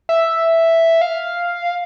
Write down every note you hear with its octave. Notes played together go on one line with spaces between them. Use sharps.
E5
F5